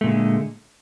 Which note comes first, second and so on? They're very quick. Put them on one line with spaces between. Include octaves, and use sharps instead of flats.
A3 A#2 D3 G#3